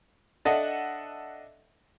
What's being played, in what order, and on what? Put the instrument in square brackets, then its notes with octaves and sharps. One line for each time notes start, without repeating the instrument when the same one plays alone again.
[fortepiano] D4 A4 D#5 E5 F#5